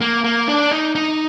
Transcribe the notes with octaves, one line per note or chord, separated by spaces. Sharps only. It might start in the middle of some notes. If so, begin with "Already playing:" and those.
A#3
A#3
D4
D#4
D#4